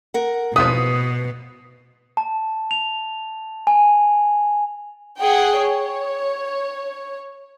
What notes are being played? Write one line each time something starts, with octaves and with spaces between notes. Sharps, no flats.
A#4 F#5
G#1 E2 B2 F3 B4 D#6
A5
F7
G#5
G#4 F#5 G5
C#5